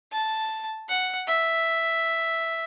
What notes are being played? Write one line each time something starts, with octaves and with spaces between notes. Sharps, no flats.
A5
F#5
E5